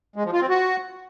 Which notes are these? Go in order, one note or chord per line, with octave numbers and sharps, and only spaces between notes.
G#3
F3
F4
C4
F#4